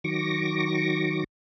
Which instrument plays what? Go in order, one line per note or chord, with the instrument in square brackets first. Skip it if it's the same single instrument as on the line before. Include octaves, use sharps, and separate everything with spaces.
[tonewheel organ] D#3 F#3 C#6 D6 A#6